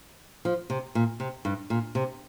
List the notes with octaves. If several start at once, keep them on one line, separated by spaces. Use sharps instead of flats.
F3
C3
A#2
C3
G2
A#2
C3